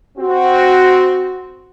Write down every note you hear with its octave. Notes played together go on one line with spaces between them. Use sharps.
C4 F#4